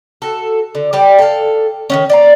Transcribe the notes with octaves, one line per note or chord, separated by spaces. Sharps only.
F#4 A4
D3
G3 G4 D5
A4 F5
D#3 B3 C#4
D5 G5 A#5